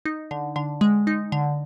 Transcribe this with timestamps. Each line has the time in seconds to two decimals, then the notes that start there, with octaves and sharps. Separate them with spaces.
0.06 D#4
0.31 D3
0.56 D3
0.81 G#3
1.07 D#4
1.32 D3